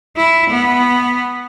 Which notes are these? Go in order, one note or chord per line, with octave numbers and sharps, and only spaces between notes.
E4
B3